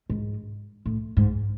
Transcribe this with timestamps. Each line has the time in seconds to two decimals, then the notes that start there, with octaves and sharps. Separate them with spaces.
0.10 G#2
0.86 A2
1.17 G#2